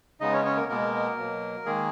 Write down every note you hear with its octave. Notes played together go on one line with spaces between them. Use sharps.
C#3 G#3 B3 D#4 D#5
C#4 C#5
C#4 C#5
A#3 A#4
B2 G#3 A#3 B3 A#4
B2 F#3 A#3
D#3 G#3 A#3 G#4